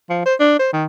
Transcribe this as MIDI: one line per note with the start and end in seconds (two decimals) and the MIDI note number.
0.09 0.23 53
0.25 0.35 72
0.40 0.56 62
0.59 0.68 72
0.73 0.85 51